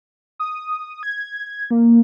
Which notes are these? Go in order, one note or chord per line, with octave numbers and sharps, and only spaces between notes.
D#6
G#6
A#3